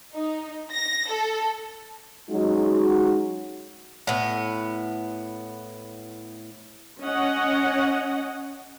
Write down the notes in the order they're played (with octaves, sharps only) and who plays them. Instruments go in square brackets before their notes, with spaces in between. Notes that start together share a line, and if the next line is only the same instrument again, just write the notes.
[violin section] D#4
A#6
A4
[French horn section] F#3 G#3 C#4 D#4 F#4
[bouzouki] A2 B3
[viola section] C#4 C#5 D#5 F#5